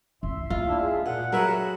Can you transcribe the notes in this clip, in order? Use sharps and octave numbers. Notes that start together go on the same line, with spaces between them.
E4 E5 C6
A#3 F4
D4 E4 E6
G#3 G#4 E5
A#2 F#5
F#3 F#4 G#4 A#4 B4 E5